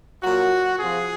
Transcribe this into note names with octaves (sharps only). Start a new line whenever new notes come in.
A#2 F#3 F#4
C3 F3 G#4